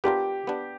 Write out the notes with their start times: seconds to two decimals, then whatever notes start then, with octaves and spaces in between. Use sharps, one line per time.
0.04 B3 D4 F4 G4 A#4
0.47 B3 D4 G4